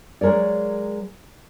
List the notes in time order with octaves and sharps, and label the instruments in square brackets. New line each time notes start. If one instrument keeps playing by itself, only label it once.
[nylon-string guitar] F#3 G#3 A#4 C#5 D5